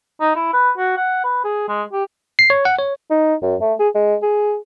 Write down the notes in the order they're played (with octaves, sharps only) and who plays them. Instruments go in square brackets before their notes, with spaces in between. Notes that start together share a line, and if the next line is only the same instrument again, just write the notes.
[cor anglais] D#4
E4
B4
F#4
F#5
B4
G#4
G#3
G4
[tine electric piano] C7
C#5
F#5
C#5
[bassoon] D#4
F#2
A3
G#4
G#3
G#4